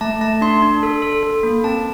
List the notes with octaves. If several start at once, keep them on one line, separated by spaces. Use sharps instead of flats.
A3 A5
A3 A5
D4 C6
D4
A4
A4
A4
A#3
C4 A5